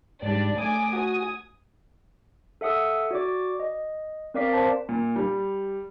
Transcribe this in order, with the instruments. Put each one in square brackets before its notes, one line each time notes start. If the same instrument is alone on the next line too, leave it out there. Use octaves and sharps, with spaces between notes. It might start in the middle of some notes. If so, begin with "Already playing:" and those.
[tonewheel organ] G#2 [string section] G3 D4 D5
[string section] A3 G#5 D6 [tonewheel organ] D#6
[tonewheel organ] F#4 [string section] G#5 D#6
[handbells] A4 E5 F#5 D#6 E6
F#4 D5 D6
D#5
C4 A#4 D5 F5 D6 B6
C5 D5 A5
[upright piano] A#2
G3